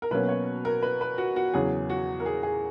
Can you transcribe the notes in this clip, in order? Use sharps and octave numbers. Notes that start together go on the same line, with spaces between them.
A#4
B2 F#3 A#3 C#4 B4
C#5
A#4
B4
B4
F#4
F#4
E2 C#3 F#3 C#4 G#4
F#4
A#4
G#4
G#4